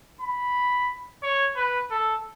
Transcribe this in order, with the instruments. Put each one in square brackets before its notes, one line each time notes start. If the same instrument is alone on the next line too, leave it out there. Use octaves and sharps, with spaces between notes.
[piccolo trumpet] B5
C#5
B4
A4